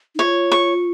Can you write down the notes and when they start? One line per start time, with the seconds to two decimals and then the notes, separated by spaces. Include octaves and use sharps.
0.15 D#4
0.19 F4 C#5
0.52 C#6